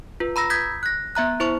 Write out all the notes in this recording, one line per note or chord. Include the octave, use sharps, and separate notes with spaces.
F4 B4
A#5 B5 E6 A#6
D#6 G6 G#6 B6
F#6 A#6
B3 E5 A#5 F#6
E4 C5 C#6